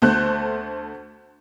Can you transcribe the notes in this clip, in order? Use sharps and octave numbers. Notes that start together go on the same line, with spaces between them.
D2 A3 C5 F#6